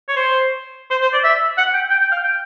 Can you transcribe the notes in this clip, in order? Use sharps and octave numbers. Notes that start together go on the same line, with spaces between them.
C#5
C5
C5
C5
D5
E5
F#5
G5
G5
G5
F5
G5